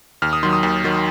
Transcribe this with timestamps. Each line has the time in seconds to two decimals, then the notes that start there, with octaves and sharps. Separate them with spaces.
0.22 D#2 F6
0.33 D#6
0.43 D#3 F#3 C6
0.53 D#6
0.63 D#2
0.84 D#3 F#3